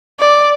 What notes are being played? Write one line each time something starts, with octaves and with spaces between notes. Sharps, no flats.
D5